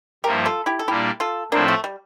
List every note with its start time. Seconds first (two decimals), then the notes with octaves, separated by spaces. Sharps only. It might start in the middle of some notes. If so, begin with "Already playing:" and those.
0.24 G2 F3 A#3 E4 G4 A#4
0.45 F4 A4
0.66 E4 G4
0.79 A4
0.88 A#2 G3 A#3 D4 E4 G4
1.20 F4 A4
1.52 A2 F3 A#3 C4 D4 E4 A4
1.68 A3
1.84 G3